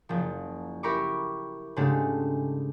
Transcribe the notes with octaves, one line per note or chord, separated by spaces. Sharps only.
F#1 F3
E4 G4 A#4 B5 C#6 D6
G#2 C#3 G#3 A3 D4 G4